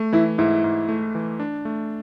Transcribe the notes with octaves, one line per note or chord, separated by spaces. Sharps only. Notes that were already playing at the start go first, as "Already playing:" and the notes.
Already playing: A3
E3 E4
G#2 E4
G#2
A3
E3
D4
A3